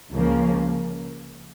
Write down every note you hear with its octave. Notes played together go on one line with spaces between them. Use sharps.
C#2 C#3 F3 A#3